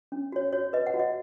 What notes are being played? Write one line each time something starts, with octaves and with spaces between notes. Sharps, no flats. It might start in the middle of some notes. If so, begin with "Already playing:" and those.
C#4
F#4 C#5
F#4 C#5
B4 D#5
F#5
F#4
D#5